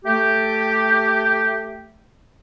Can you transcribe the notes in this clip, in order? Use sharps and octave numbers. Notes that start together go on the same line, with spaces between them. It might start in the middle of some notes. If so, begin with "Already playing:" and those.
A3 G4